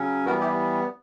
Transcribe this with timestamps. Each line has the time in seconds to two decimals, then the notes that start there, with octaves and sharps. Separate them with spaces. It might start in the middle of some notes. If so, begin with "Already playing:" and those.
Already playing: C#3 F#3 C#4
0.26 E3 G3 B3 F#4 A#4
0.40 E4 G4